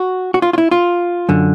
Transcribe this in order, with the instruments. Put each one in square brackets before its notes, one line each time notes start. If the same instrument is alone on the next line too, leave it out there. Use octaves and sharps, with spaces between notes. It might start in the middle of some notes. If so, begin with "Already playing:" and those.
Already playing: [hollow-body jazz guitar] F#4
F#4
F4
F4
E4
F4
F#2 D3